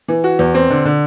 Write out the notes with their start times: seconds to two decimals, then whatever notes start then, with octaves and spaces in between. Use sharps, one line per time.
0.08 E3
0.24 F#4
0.39 E2
0.55 C4
0.70 D3
0.85 D3